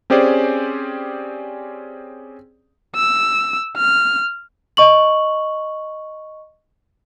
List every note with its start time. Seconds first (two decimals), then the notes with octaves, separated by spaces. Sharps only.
0.10 C4 C#4 G4 G#4 C5 D5
2.96 E6
3.77 F6
4.77 D#5 C#6 F#7